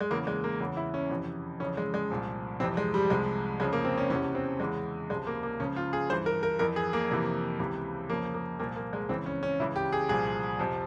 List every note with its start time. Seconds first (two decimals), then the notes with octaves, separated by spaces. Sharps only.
0.01 G#3
0.11 E2 C#3 E3 A#3
0.27 G#3
0.44 A#3
0.60 E2 C#3 E3
0.77 E4
0.94 C#4
1.10 F2 C3 E3
1.60 F2 C#3 E3 C#4
1.77 G#3
1.94 G#3
2.11 C2 A#2 F3
2.60 F2 C3 E3 C4
2.77 G#3
2.94 G3
3.10 C2 C3 F3 G#3
3.60 F2 C#3 F3 G#3
3.73 A#3
3.84 C4
3.97 C#4
4.10 E2 C3 E3 C#4
4.35 C4
4.60 E2 C#3 E3 G#3
5.10 C#2 C3 F3 G#3
5.27 A#3
5.43 A#3
5.60 C#2 C#3 F3 C#4
5.76 F4
5.93 G#4
6.10 G2 C5
6.13 E3
6.26 A#4
6.43 A#4
6.59 F2 E3 A#4
6.76 G#4
6.93 A#3
7.10 F2 C3 E3
7.59 C#2 C3 E3
8.10 F2 C#3 F3 A#3
8.34 A#3
8.60 C2 A#2 F3 A#3
8.76 A#3
8.93 G#3
9.09 C#2 C#3 E3 C4
9.26 C#4
9.43 C#4
9.59 C#2 C#3 E3 E4
9.76 G4
9.92 G#4
10.09 C2 A#2 F3 G#4
10.59 F2 C3 F3